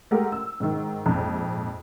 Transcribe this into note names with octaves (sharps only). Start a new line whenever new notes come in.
G#3 A3 G4 A#4 F#5
E6
G#2 D#3
A#1 F2 G#2